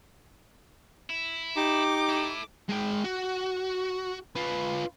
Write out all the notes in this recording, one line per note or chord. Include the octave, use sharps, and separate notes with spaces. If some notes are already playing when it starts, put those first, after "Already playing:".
E4
D#4 G4 D6
E4 A4
G#3 G5
F#4
F4 B4